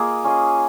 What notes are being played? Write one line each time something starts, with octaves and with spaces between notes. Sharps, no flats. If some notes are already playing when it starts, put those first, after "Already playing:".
Already playing: A#3 F4 G#4 D#5
C#4 F4 G#4 D#5